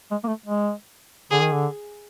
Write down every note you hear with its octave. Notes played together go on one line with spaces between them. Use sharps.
G#3
A#3
A3
G#3
D3 G#4
D#3
D3